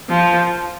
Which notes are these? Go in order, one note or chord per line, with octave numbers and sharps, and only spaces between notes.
F3